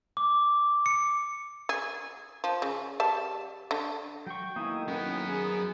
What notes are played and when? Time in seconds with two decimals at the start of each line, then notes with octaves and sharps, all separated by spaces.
0.17 D6
0.86 C#7
1.69 G#4
2.44 F3
2.62 C#3
3.00 G3 A5
3.71 D3
4.26 F#3 G5 C#6
4.56 B1 D#3 A#3 E4 G#5 D#6
4.88 F#3 B3 C#4 A#4 B4
5.28 G#4